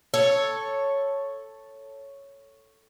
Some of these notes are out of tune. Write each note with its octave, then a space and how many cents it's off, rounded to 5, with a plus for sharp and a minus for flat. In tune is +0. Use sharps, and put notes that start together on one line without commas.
A4 +0 C#5 +0